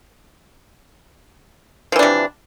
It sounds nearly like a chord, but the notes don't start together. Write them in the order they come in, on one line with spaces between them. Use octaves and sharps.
F3 E3 D4 C3